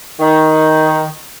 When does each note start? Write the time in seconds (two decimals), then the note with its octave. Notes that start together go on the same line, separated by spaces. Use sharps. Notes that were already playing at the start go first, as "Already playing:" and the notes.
0.20 D#3